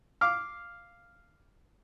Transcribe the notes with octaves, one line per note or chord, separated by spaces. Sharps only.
F5 D6 F6